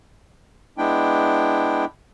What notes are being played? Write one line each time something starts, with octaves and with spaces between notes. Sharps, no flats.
G#3 B3 D4 E4 G5